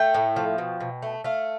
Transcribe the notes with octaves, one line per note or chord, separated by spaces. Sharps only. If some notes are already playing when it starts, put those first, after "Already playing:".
Already playing: A3 G5
A2
F3
B2
B2
A3
A3 F5